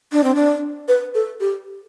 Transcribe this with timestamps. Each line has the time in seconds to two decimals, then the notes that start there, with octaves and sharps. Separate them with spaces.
0.12 D4
0.24 C4
0.35 D4
0.88 B4
1.15 A4
1.40 G4